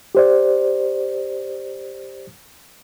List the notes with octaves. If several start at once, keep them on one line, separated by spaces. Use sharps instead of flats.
G4 C5 D5